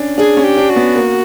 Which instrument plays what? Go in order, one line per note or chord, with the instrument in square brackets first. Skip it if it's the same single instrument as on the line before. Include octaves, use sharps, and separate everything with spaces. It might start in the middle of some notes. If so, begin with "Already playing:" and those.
Already playing: [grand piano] C#4 D4
[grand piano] D4 [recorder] G#4
[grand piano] C#4
[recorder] G4
[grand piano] D4
[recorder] F#4
[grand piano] B3
A#3